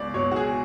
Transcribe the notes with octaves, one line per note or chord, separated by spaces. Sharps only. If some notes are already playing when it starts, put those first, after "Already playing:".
Already playing: C#2 B2 D5
B2 F#3 C#5
F#4
G#4